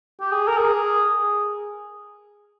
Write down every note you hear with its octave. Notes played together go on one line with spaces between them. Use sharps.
G4
G#4
A#4
G#4